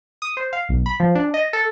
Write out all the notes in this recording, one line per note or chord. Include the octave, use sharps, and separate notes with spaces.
D#6
C5
F5
B1
B5
F3
D4
D#5
A4